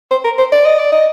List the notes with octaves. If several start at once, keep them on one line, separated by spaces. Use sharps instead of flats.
C5
A#4
C5
D5
D#5
D5
D#5